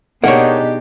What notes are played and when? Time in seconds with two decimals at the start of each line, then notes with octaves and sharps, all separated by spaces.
0.24 B2 A#3 D4 D#4 G4 G#4 C#5 F#5